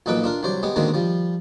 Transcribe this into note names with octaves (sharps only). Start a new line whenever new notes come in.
B1 A#2 D#4 A4 B4 D6
D4 F4 A#4
C2 F#3 C5 D5
G#3 B3 G4
B2 D3 D#3 G#3 A#3 C4
F3 G3